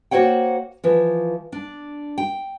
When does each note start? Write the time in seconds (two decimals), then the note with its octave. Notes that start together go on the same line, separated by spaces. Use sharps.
0.11 A#3 F#4 C5 C#5 F#5 G5
0.84 E3 F3
1.52 D4
2.18 G5